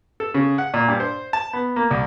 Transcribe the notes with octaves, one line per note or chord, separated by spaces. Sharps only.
A4
C#3
F#5
A#2
G2
C5
A5
B3
A#3
C2